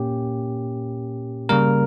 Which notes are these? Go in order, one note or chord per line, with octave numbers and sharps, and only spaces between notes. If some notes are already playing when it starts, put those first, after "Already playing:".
Already playing: A#2 A#3 C#4 G4
C#3 G3 A#3 A#4